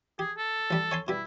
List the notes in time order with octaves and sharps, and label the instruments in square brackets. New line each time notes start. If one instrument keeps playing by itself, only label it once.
[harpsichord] G4 [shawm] G#4
[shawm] A4
[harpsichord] A1 G3
C#5 G#5 C6
[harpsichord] B2 G3 [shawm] E4